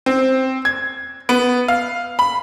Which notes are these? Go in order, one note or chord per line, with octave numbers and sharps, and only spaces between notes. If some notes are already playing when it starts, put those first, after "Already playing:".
C4
G#6
B3
F5
B5